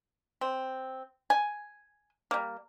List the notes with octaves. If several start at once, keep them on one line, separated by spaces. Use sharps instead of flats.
C4
G#5
G3 A#3